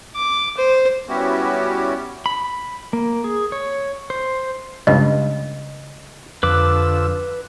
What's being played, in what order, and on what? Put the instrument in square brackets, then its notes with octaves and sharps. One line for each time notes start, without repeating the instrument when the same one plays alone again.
[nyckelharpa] D6
C5
[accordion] G3 B3 C#4 E4 F#4 G4
[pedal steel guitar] B5
A#3
G#4
C#5
C5
[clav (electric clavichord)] C#2 G2 [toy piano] D#5
[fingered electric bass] F2 [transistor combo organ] D3 F3 E6 [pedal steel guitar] B4 D6